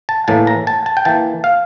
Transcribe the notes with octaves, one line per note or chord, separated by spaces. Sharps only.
A5
A2 E3 A#3 A5
A#5
A5
A5
G5
E3 A#3 A5
F5